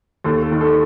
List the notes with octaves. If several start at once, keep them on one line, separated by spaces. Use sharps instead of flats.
D#2 A4
A4
D#3
A4